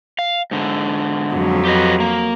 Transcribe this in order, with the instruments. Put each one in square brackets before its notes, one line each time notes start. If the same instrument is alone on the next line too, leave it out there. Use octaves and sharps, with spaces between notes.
[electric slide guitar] F5
G#2 D3
[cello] F2 F#3
[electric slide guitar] G4 B4 D#5
A#3